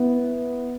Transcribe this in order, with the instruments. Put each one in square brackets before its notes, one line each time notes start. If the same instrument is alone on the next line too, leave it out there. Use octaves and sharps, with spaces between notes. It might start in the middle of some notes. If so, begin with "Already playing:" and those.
Already playing: [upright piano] B3 [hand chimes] E4 B4 E5